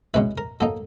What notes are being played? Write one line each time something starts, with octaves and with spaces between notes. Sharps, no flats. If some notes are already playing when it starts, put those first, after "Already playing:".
B2 G#3 C#4 E4 B4
A#4
F#3 A#3 D#4 A4